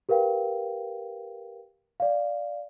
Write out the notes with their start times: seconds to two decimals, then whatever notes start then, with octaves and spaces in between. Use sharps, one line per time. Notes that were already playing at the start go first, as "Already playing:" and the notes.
0.09 G4 A#4 B4 F5 G5
2.00 D5 F5